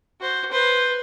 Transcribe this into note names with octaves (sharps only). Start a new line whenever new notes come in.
F#4 C5
B4 C5